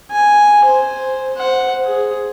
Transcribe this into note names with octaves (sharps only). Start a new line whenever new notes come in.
G#5
C5
C5 F#5
G#4